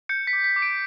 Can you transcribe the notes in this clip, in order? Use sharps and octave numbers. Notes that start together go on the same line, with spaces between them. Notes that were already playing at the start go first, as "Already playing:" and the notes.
G6 C#7
B6
D6
B6
D6
D7